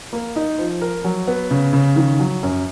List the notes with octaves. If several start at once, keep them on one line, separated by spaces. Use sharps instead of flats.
A#3
D#4
F3
A#4
F#3
B3
C#3
C#3
D#3
F#3
F#2